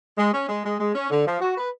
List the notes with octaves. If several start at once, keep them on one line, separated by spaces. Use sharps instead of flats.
G#3
C#4
G#3
G#3
G#3
C#4
D3
F3
F#4
B4